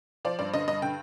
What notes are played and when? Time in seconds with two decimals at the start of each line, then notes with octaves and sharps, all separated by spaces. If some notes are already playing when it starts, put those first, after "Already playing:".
0.25 F3 D5
0.39 G2 D5
0.54 D3 D#5
0.68 G2 D#5
0.82 D3 G5